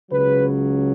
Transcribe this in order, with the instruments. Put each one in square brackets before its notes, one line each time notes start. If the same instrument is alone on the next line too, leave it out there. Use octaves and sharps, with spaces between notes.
[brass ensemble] C#2 C#3 F#3 B4